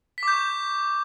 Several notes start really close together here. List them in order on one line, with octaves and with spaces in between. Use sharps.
B6 D6 G6 C#6